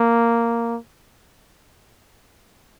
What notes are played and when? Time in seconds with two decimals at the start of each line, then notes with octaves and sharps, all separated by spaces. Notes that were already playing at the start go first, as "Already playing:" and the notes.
Already playing: A#3